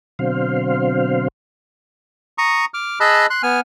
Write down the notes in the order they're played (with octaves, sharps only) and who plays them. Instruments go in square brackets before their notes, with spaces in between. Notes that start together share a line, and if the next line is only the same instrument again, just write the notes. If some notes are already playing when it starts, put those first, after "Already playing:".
[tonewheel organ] B2 D3 F#3 C4 C5 F5
[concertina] A#5 C#6 D#6
D6 F6
G#4 D#5 A5 B5 E6 F#6
C6 F#6
B3 G#5 F6